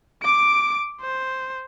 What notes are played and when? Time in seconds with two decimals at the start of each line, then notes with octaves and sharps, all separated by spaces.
0.22 D6 D7
1.01 C5